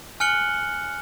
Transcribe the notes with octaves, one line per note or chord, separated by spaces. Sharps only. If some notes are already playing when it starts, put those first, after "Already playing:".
G#5 F6 F#6 C#7 F#7 G7